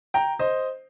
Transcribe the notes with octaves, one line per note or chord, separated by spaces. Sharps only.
G5 A#5
C5 D#5